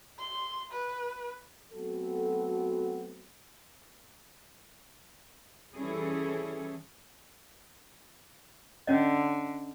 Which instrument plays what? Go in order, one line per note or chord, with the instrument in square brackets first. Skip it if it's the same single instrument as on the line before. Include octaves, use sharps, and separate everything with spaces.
[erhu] C6
B4
[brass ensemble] F#3 A3 B3 C4 F#4 A4
[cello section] E3 G3 C#4 E4 G#4 A4
[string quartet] D3 [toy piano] C#4 C#5 D#5